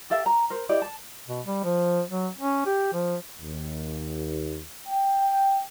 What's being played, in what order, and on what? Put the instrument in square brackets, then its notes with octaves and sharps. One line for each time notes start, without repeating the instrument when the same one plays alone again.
[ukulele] G4 A4 E5 F5
A#5
A#4 C5
E4 G4 D5 D#5
A5
[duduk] B2
G3
F3
F#3
C#4
G4
F3
[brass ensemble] D#2
G5